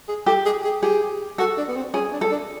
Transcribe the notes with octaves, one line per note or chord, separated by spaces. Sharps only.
G#4
G4 A4
G#4
G#4
G4 G#4
F#4 A4
D4
B3
C4
C#4 G#4
D4
A4
D4